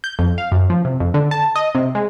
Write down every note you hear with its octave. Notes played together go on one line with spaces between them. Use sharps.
G6
F2
F5
F#2
F3
C3
F2
D3
A5
D#5
C3
G#3